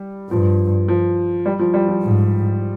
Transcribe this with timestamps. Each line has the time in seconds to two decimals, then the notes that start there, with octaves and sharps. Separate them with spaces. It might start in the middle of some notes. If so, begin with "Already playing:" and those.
Already playing: G3
0.30 G2 F3
0.88 F3
1.46 G3
1.59 F3
1.74 G3
1.88 F3
2.03 G#2